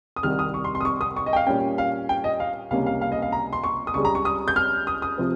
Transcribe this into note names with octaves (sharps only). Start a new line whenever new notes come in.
D#6
C2 C3 D#3 G3 F6
D#6
C#6
C6
C6
D#6
C#6
D#6
C#6
D#5
G5
F5
A#2 G3 C#4 G5
F5
G5
D#5
F5
C#2 C3 G3 A#3 C#4 F5
F5
F5
D#5
F5
A#5
C6
C#6
D#6
C#2 C#3 G3 C#6
A#5
C#6
D#6
G6
F6
D#6
D#6
C3 F3 C4